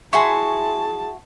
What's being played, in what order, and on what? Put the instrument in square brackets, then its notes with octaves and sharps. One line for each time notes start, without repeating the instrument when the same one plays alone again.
[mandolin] E4 F#4 C6 [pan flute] G#4 [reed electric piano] G#5 C#6 [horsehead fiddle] A5